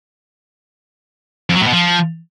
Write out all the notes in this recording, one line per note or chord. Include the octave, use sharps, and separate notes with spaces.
F2
F#3
A2
B2
F3